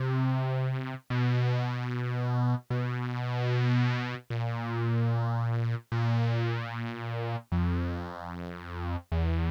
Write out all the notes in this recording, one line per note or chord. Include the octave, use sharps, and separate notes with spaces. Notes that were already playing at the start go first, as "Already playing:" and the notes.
Already playing: C3
B2
B2
A#2
A#2
F2
E2